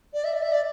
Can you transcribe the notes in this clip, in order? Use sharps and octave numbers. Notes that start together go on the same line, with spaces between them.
D5
E5
D5
E5
D5